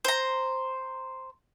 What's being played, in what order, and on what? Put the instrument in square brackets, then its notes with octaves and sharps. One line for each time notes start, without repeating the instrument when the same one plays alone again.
[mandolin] C5 A#5